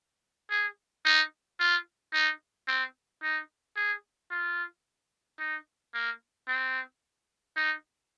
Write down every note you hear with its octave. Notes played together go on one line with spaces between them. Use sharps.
G#4
D#4
F4
D#4
C4
D#4
G#4
F4
D#4
A#3
C4
D#4